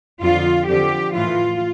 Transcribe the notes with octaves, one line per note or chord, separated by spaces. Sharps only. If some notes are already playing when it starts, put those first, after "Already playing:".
F2 D3 F3 F4
F2 D3 F3 G4
A2 E3 F4